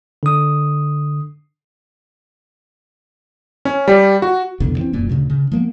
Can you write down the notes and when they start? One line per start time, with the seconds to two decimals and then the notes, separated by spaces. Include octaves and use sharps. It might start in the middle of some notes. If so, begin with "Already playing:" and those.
0.23 D3 D#6
3.65 C#4
3.88 G3
4.22 F#4
4.60 C2 F2 B2 D3
4.78 E3 C4 C#4
4.93 E1 F#2 A#2 C#4
5.09 D2 A#2 C#3
5.30 C#3
5.52 F3 G#3 A#3 B3